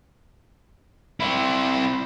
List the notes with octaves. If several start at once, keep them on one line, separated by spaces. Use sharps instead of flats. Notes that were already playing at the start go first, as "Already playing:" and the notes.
C4 E4